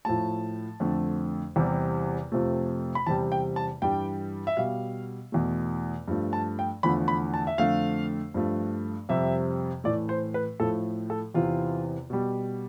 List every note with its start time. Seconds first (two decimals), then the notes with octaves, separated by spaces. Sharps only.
0.05 A2 F3 A3 A5
0.80 F2 D3 A3
1.56 E2 C3 G3
2.32 F2 C3 F3 A3
2.95 B5
3.07 E2 C3 G3 A5
3.32 G5
3.56 A5
3.82 G2 E3 G3 G5
4.47 E5
4.57 B2 G3 F5
5.32 E2 B2 A3
6.08 G2 F3 A3
6.33 A5
6.59 G5
6.83 E2 D3 F3 A3 B5
7.08 B5
7.34 A5
7.47 E5
7.58 F2 D3 A3 F5
8.34 G2 F3 A3
9.09 F2 C3 G3 E5
9.84 A2 E3 A3 D5
10.09 C5
10.34 B4
10.60 A2 F3 A3 A4
11.10 A4
11.34 E2 C3 E3 F4
12.10 B2 G3